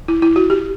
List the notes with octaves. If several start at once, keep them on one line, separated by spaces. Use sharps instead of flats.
E4
E4
F#4
G4